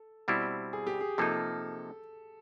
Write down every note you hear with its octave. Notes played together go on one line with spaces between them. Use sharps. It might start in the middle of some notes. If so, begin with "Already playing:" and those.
Already playing: A4
B2 G3 C4 E4
G#4
G4
G#4
C3 F3 A#3 D#4 A4